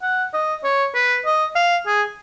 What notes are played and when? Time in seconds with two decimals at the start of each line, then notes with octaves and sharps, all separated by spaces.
0.02 F#5
0.33 D#5
0.64 C#5
0.94 B4
1.25 D#5
1.56 F5
1.87 G#4